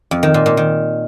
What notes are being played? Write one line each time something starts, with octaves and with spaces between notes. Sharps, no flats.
F2
D#3
A#2
A#2
D#3